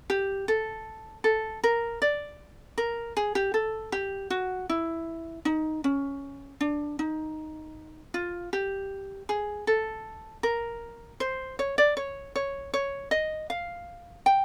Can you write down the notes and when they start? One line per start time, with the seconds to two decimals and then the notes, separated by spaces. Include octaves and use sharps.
0.10 G4
0.48 A4
1.24 A4
1.64 A#4
2.02 D5
2.78 A#4
3.17 G#4
3.35 G4
3.54 A4
3.92 G4
4.30 F#4
4.69 E4
5.45 D#4
5.84 C#4
6.61 D4
6.99 D#4
8.14 F4
8.53 G4
9.29 G#4
9.67 A4
10.43 A#4
11.20 C5
11.59 C#5
11.78 D5
11.97 C#5
12.36 C#5
12.74 C#5
13.11 D#5
13.50 F5
14.26 G5